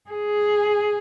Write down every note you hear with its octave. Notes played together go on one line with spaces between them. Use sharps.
G#4